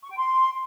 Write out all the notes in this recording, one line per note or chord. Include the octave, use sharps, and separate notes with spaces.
C#6
G5
C6